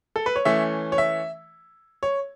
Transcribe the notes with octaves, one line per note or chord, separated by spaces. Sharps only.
A4
B4
C#5
E3 A3 C#4 E5
C#5
E5
C#5